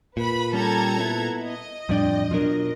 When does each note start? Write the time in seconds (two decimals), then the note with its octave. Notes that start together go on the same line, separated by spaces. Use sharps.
0.17 A#2 B4 B5
0.53 G3 C#4 G4 A4 A#5 G#6
1.00 B3 E4
1.44 D#5
1.89 F2 A2 G3 D4 D5 G5
2.31 B2 F#3 D4 F4 A#4